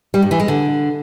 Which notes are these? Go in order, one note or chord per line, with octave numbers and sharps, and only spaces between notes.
G3
G2
E3
G#3
D3